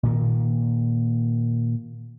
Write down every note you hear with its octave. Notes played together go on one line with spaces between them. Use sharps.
A#2 D#3 A#3